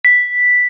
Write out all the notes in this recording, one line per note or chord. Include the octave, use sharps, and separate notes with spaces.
B6